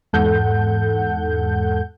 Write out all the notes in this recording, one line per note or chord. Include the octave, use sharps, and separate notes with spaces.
E2 G#2 A4 F#5 G6